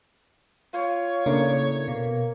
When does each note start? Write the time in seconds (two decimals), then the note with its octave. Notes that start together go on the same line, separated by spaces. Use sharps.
0.73 F4 C#5
1.26 A2 C#3 A#3 D4
1.88 B2 A#3